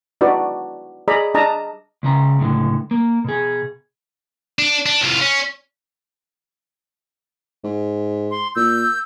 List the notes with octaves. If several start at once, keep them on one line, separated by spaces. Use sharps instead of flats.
D4 D#4 F#4 B4 D5
G#4 D5 D#5 A#5 B5
D4 D#5 A5 A#5
C#2 C#3 A#5
C#2 A2 D3
A#3
B2 G#4
D4
D4
C2 F4
C#4
G#2
C6
A#2 E6 G6